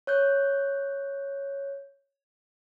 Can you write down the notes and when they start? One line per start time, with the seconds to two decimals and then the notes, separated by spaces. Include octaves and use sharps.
0.07 C#5 F#6 G6